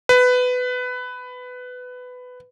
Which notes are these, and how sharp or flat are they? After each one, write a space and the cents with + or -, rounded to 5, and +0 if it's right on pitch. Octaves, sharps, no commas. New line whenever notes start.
B4 +15